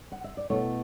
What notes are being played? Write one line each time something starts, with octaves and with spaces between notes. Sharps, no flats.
F#5
E5
D5
B2 A3 E4 C#5